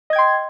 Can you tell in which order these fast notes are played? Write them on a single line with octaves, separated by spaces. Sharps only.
D#5 G#6 G5 C6